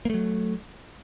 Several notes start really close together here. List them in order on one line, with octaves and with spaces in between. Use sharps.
A#3 A3 F#3